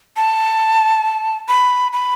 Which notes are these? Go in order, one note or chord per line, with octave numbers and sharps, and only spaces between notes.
A5
B5
B5